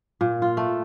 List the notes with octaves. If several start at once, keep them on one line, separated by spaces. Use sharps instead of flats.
A#2
F4
A3